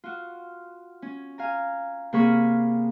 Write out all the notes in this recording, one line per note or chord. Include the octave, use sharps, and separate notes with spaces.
F4 F#4
C#4
F5 G#5 A#5
C3 A#3 G#4 F5 B5 C#6